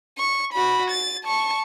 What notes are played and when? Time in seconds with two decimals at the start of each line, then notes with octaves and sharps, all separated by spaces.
0.18 C#6
0.53 F#4 B5
0.91 A6
1.25 A5 C#6